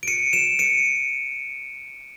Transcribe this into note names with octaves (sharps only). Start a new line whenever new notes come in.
D7
C#7 D#7
D7 E7
C#7 D#7